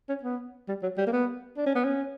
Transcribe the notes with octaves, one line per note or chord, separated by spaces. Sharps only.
C#4
B3
G3
F#3
G3
A#3
B3
D4
C#4
B3
C#4